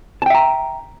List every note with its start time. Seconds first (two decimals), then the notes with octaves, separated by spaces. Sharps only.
0.22 A5
0.26 G5
0.30 E5
0.35 A#5